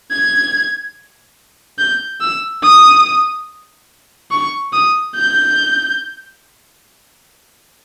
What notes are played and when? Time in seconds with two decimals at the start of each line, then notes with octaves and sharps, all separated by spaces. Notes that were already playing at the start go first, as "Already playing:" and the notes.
0.11 G#6
1.79 G6
2.21 E6
2.63 D#6
4.31 C#6
4.73 D#6
5.15 G6